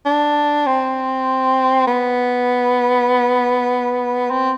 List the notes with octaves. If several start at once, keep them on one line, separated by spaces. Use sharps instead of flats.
D4
C4
B3
C4